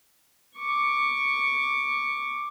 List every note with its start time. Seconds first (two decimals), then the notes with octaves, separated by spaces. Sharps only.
0.57 C#6 D6